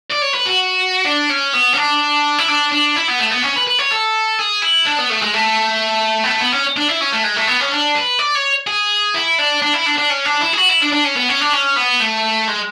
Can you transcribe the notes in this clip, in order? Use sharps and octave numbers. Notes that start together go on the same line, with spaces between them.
D5
C#5
B4
F#4
D4
C#4
B3
C#4
D4
E4
D4
D4
E4
B3
A3
B3
C#4
B4
B4
C#5
A4
G#4
E4
D4
B3
A3
G#3
A3
B3
A3
B3
C#4
D4
E4
C#4
A3
G#3
A3
B3
C#4
D4
B4
D5
C#5
G#4
E4
D4
D4
E4
D4
D4
C#4
D4
E4
G#4
F#4
E4
D4
D4
C#4
B3
C#4
D4
C#4
B3
A3
G#3